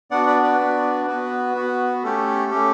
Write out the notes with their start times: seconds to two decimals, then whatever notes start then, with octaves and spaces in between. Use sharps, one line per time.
0.11 B3 D4 F#4 D5 F#5
0.26 B4 D5
0.43 B4 D5
0.59 B3 D4 F#4
1.07 B3 F#4 B4
1.55 B3 F#4
2.03 A3 C#4 G4 A4
2.51 A3 C#4 G4